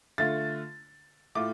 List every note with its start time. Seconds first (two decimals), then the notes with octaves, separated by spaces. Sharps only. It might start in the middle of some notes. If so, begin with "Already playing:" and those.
0.18 D3 A3 F4 A6
1.35 A2 A3 F4 D6